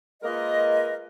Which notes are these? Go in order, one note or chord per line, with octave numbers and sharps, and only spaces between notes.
G#3 A#3 F4 A#4 B4 D#5